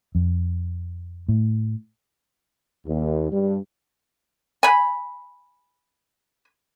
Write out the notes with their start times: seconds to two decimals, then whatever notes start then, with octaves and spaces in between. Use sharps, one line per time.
0.15 F2
1.29 A2
2.86 D#2
3.31 G2
4.63 G#5 B5